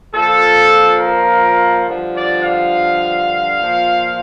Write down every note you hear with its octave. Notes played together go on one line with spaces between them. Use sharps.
A#2 F3 A4
A#4
G2 D3 F3
D5
F5
A#2 F3